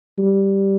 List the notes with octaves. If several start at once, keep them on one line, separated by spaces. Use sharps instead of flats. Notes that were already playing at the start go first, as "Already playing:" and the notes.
G3